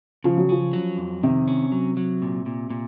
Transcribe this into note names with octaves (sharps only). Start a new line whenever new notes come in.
C#3 F3
F#3
F3 C#4
F#3
F2
C3 D#3
C#4
F#3
F#3
A#2
A#2
A#2